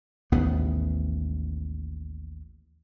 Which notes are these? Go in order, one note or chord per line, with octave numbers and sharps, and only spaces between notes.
A1 D#2 G#2 B3